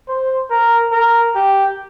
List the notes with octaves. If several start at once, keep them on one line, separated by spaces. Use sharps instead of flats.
C5
A#4
A#4
G4